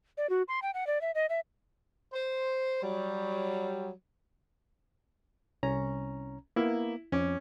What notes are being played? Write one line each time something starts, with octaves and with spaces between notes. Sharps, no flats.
D5
F#4
C6
G5
F#5
D5
E5
D#5
E5
C5
F#3 G3
C2 C#4 A#5
A#3 B3 E4
F2 C#4 D6